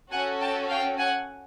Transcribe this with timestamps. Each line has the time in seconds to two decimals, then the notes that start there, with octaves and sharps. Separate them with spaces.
0.12 C#4 F#4 A4 F#5 G#5
0.41 G5 A5
0.69 F5 G5
0.99 F#5 G#5